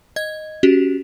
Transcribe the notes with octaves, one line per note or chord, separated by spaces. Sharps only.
D#5 G#6
C#4 F#4 G4